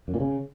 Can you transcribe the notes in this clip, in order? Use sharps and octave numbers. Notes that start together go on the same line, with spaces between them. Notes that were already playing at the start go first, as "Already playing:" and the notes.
F#2
A#2
C#3